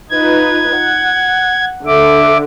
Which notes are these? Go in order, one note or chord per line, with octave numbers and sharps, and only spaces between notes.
D#4 F4 B4 G#6
F#5
D3 E5 D6